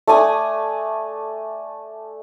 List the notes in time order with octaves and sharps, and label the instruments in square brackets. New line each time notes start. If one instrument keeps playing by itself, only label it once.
[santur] A3 D5 G#5 D#6